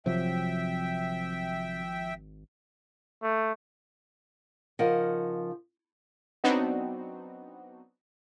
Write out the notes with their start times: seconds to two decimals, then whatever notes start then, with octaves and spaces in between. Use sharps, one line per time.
0.06 G#1 C3 F3 F#3 E5 G5
3.22 A3
4.79 C#3 F3 D#4 A#4 D#5 F#5
6.44 F#3 B3 C4 D4 D#4 F#4